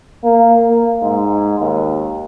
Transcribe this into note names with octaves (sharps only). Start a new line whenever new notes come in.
A#3
A#3
G#2
D#2